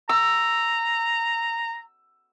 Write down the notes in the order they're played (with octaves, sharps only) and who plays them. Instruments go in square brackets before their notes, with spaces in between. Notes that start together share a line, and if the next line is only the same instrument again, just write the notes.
[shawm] A#5 [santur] E6